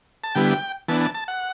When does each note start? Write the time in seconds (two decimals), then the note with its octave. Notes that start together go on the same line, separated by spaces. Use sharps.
0.24 A5
0.35 D3 G3 B3 E4 G5
0.88 E3 B3 D4 A5
1.01 A5
1.15 A5
1.28 F#5